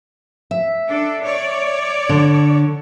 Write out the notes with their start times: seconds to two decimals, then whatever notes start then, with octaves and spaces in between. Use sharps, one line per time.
0.51 E5
0.89 D4 A4
1.24 C#5 D5
2.09 D3